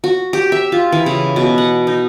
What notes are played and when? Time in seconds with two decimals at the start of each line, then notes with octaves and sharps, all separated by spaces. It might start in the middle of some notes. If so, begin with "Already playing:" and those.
0.04 F#4
0.33 G4
0.52 E5
0.72 F4
0.92 E3
1.06 C#3
1.36 B2
1.58 F#5
1.87 D#4